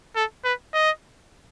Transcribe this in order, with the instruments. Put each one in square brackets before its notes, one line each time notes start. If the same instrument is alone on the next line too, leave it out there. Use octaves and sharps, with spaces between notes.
[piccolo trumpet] A4
B4
D#5